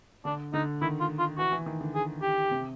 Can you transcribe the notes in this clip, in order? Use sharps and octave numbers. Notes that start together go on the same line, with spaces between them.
D3 D4
D3 D#4
D#3 E4
F4
F4
E3 F#4
E3
D#3
D3
G#4
G4
C3